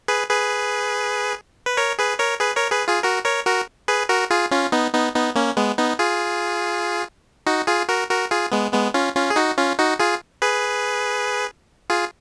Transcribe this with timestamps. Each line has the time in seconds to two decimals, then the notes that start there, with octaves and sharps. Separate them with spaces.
0.08 G#4 B4
0.29 G#4 B4
1.66 B4
1.77 A#4 C#5
1.99 G#4 B4
2.19 A#4 C#5
2.40 G#4 B4
2.56 A#4 C#5
2.72 G#4 B4
2.88 F4 G#4
3.03 F#4 A#4
3.25 A#4 C#5
3.46 F#4 A#4
3.88 G#4 B4
4.09 F#4 A#4
4.31 F4 G#4
4.51 C#4 F4
4.72 B3 D#4
4.93 B3 D#4
5.14 B3 D#4
5.35 A#3 C#4
5.57 G#3 B3
5.78 B3 D#4
5.99 F4 G#4
7.46 D#4 F#4
7.67 F4 G#4
7.89 F#4 A#4
8.10 F#4 A#4
8.31 F4 G#4
8.52 G#3 B3
8.73 G#3 B3
8.94 C#4 F4
9.15 C#4 F4
9.30 G#4
9.36 D#4 F#4
9.58 C#4 F4
9.79 D#4 F#4
9.99 F4 G#4
10.42 G#4 B4
11.90 F4 G#4